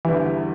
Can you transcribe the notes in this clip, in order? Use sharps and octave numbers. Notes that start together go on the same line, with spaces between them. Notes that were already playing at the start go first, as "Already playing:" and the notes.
E2 D3 E3 G3 E4